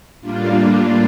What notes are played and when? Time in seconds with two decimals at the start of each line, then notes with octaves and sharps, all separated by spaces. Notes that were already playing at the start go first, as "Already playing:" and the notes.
0.21 A2 G3 A#3 D4 F4
0.60 F4